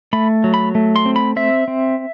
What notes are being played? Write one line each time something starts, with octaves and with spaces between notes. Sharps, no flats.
A3 B5
F#3
B5
A3
C6
C4
B5
C4 E5
C4